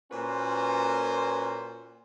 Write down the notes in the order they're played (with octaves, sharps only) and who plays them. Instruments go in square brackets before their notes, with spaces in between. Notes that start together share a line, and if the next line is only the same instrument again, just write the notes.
[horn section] A#2 C#4 F#4 B4 C5